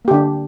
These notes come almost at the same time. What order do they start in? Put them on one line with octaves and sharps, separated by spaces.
A#3 G4 D3 D4